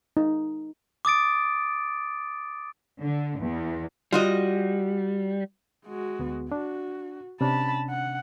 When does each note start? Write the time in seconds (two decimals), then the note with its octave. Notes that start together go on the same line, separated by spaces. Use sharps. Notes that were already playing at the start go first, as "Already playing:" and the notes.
0.17 D#4
1.05 D6 D#6 A6 D7
3.01 D3
3.39 E2
4.13 G3 F4 F#4 D#5
5.85 G#3 F#4
6.19 D2 B3
6.52 D4 F#4
7.41 C3 C#4 D4 A5 B5
7.90 F#5